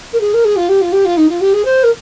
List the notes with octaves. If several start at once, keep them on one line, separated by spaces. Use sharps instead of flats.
A#4
G#4
A#4
G#4
F4
G4
F4
G4
F4
D#4
F4
G4
G#4
C5
A#4